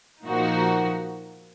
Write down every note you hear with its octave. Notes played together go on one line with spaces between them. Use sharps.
A#2 F3 A#3 D#4 F#4